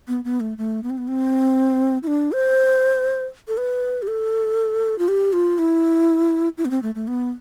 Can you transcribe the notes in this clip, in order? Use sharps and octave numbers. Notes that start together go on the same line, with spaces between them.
B3
B3
A3
A3
B3
C4
B3
C4
E4
D4
C5
A4
B4
G4
A4
F4
G4
F4
E4
E4
B3
C4
A3
A3
B3